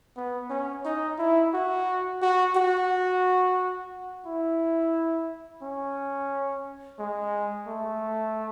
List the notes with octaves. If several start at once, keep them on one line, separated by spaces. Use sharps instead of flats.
B3
C#4
D#4
E4
F#4
F#4
F#4
E4
C#4
G#3
A3